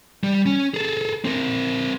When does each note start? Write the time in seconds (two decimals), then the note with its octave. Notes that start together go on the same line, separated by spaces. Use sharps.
0.24 G3
0.46 C#4
0.74 G#4 A4
1.25 C4 A#4